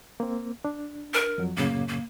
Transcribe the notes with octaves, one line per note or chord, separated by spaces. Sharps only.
A#3 C4
D4
A#4
F2 F#3
F#2 A2 C#3 A#3
A#3